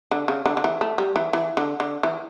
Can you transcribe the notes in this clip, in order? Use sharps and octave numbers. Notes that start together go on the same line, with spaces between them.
D3
C#3
D3
D3
E3
A3
G3
E3
E3
D3
D3
E3